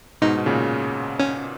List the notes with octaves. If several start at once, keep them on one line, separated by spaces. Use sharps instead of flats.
G#2 B2 D#4
B2
A#2 C#3
C#4